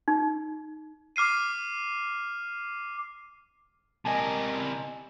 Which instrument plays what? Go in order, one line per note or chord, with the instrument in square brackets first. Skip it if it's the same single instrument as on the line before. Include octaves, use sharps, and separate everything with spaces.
[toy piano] D#4
[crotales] D6 F6 C7 D#7
[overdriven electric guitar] C3 A#4 [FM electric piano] D#5 G#5 A5